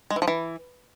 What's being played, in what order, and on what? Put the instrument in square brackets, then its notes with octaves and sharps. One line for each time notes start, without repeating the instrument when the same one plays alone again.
[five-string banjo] G#3
E3
F3
E3